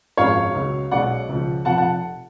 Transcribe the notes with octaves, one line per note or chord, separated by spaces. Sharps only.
G#1 F#2 F3 G#3 C#4 C#5 F5
C#2 C#3 F#3
B1 B2 G#3 C#4 D5 F#5
C#2 C#3 F3
F1 F2 F3 F#5 A5
F#5 A5